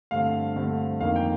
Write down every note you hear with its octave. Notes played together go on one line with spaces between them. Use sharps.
G2 D3 A3 C4 F5
G2 D3 A3 C4
F2 D#3 A#3 F5
G5